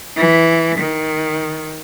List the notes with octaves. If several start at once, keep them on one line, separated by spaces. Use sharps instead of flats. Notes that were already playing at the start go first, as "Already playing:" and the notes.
E3
D#3